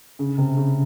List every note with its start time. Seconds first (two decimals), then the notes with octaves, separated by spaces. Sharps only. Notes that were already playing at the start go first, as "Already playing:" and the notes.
0.19 C#3
0.38 C3
0.57 C#3